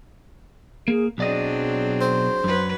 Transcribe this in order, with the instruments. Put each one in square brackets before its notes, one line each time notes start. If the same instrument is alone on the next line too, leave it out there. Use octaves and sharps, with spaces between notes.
[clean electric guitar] A#3 [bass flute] G#4
[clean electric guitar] B1 D5 D#5 [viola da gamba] F#3 C4 D4 [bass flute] G#4
[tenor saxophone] C5
[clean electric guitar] F#2 [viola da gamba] F#3 B4